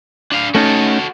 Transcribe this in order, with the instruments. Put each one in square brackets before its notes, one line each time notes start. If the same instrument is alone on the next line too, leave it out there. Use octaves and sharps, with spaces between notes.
[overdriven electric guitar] D4 F5
[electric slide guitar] A3 C#4 D#4 [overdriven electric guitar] F#4 A4